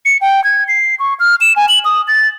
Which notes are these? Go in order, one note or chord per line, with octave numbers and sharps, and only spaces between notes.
C#7
G5
G#6
C7
C#6
F6
E7
G#5
F#7
D#6
A6